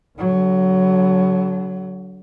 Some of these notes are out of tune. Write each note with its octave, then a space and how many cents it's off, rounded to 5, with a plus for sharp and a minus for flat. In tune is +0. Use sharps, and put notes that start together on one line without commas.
D3 -30 F#3 +15